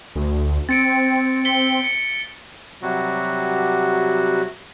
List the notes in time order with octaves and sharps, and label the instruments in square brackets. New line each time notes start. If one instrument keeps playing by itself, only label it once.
[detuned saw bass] D2
[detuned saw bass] C4 [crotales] A6 C#7 D7
[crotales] B6 C#7 G7
C#7
[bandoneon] C3 F#3 G3 F#4